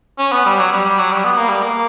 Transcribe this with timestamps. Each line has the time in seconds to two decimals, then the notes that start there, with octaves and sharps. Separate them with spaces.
0.19 C#4
0.32 B3
0.46 G3
0.59 F#3
0.72 G3
0.85 G3
0.99 F#3
1.11 G3
1.25 B3
1.38 A#3
1.49 G3
1.62 A#3